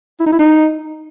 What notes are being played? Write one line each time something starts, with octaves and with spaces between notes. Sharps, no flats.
E4
D#4
E4
D#4